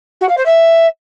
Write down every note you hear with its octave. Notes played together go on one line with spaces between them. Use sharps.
F#4
F5
C5
E5